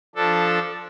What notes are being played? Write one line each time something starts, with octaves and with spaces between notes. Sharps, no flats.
F3 D4 A4